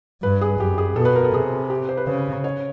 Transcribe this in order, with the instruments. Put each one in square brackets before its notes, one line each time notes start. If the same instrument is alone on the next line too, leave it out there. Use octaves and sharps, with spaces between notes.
[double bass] G2 [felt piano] B4
[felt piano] G#4
[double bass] F#2 [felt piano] G4
[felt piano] G#4
[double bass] B2 [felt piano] A4
[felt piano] B4
A#4
A4
[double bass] C3 [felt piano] G#4
[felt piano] G4
C5
B4
[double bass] C#3 [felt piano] C5
[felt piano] C#5